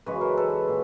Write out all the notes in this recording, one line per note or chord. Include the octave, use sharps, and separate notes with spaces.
F#2 C#3 E3 G#3 B4 C#5
A#4 C5
A4 B4
A#2